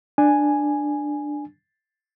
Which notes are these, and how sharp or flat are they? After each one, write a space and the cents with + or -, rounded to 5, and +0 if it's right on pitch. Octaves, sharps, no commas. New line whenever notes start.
D4 +10 G#5 +0